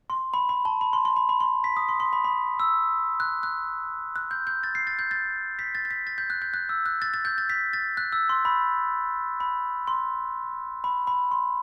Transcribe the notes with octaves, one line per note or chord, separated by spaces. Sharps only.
C6
B5
B5
A5
B5
C6
C6
B5
B5
C6
B6
D#6
C6
C6
B5
B5
E6
F#6
F#6
F#6
G6
G6
A6
C7
A6
G6
A6
B6
A6
A6
B6
A6
G6
F#6
G6
F#6
E6
F#6
A6
A6
G6
A6
B6
A6
F#6
E6
C6
B5
B5
C6
B5
B5
C6